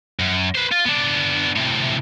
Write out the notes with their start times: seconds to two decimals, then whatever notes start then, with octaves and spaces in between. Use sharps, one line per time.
0.19 F#2
0.55 B4 C5
0.72 F4
0.85 B3 D4
1.56 A2 C3